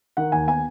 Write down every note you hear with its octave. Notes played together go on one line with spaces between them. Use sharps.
D#3 F#5
D#2 G#5
B3 G#5